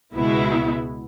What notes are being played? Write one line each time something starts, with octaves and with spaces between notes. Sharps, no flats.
C#2 B2 G#3 B3 E4